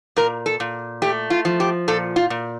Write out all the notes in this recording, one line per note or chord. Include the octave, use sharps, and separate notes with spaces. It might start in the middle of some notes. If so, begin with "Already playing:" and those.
A#2 A#4
A4
A#2
A3 G4
F4
F3
G4
A#2 A4
F4
A#2